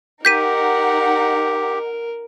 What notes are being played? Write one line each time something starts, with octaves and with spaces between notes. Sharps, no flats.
D#4 G4 A#4 F#5 G6 B6 D#7